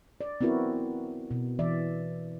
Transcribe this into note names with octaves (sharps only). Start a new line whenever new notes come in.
D5
B3 C4 E4 F#4 A#4
B2
E3 D5 E5